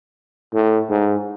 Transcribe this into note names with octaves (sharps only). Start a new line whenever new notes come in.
A2
G#2